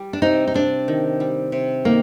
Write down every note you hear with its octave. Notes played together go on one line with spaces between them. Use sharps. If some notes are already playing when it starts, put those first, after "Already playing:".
Already playing: G3
D4
C3 D#4
D#4
C3 D4
D#3
G3
C3
D#3 A#3